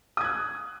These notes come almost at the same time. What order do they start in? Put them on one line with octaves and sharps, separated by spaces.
D#6 G#6 F#6